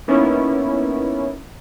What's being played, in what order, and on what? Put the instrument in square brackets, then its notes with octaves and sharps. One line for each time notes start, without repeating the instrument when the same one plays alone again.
[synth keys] A#3 B3 C#4 D#4 E4